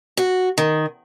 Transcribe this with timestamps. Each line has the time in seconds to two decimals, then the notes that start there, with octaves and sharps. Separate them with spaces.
0.17 F#4
0.58 D#3